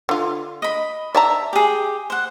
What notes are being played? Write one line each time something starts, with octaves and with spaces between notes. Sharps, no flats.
D3 F4
D#5 B5
D5 E5 A5 A#5
G4 G#4
C5 F#5